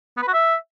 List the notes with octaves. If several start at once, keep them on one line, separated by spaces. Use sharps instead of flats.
B3
B4
F#4
E5